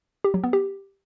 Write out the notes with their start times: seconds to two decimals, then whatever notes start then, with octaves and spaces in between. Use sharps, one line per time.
0.24 G4
0.34 F#3
0.44 B3
0.53 G4